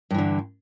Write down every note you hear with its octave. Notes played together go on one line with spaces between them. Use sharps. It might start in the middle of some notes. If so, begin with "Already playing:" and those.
G2 D3 E3